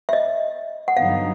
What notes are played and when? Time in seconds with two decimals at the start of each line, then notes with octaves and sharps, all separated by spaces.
0.09 E5
0.13 D#5
0.88 F#5
0.96 G2 D3 F#3 B3 D#4 F5